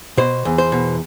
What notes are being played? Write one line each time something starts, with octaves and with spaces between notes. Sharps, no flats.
B2 C5
E2
C5
B2